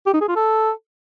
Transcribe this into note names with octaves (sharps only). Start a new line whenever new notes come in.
G4
D#4
G#4
F4
A4